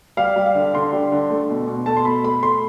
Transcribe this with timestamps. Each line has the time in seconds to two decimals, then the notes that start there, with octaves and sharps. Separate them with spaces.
0.17 G3 F5
0.36 G3
0.46 F5
0.55 D3
0.74 D3 C6
0.93 G3
1.12 D3
1.30 A3
1.49 B2
1.67 B2
1.86 A3 A5
1.97 C6
2.05 B2 B5
2.24 A3 B5
2.43 A3 C6